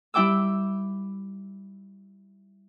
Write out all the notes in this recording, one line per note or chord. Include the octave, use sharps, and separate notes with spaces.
G3 E4 G5 D6 E6